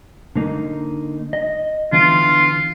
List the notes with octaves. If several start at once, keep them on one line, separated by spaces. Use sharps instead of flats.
D3 A#3 D#4
D#5
D3 E3 B3 F4